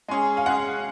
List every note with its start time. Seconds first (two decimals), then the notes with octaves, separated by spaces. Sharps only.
0.08 G#3 C#4 G#4 G#5
0.37 F5
0.46 G#3 C#4 G#4 F#5